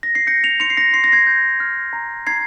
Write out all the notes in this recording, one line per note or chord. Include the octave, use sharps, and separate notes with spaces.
A#6
C7
G6 A#6 C#7
C#7 F7
C6 C#7 F7
C7
A#6 C#7
C6 C7
A#6
G#6 C7
G6
F6
A#5
A#5 G#6 C7